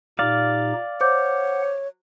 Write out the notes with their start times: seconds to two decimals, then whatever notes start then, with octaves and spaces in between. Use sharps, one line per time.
0.19 A#2 D#4 G4 D5 F5
1.01 C5 C#5 F#5 D6 G6